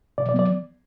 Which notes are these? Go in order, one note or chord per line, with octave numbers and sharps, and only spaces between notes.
B2 D5
D5
F#3 B3
D5